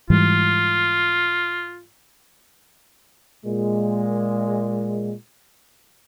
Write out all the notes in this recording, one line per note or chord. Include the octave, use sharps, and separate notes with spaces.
G#2 E3 G3 F4
A#2 G#3